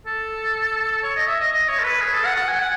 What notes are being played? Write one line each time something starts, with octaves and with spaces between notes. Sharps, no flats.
A4
C#5
D#5
E5
D#5
D#5
C#5
A4
B4
G#4
A4
F#5
F#5
G#5
F#5